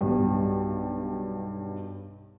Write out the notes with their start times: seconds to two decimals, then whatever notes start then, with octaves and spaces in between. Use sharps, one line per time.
0.01 B1 G2